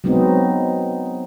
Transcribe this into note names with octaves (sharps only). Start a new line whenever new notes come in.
F#3 G#3 B3 C4 D#4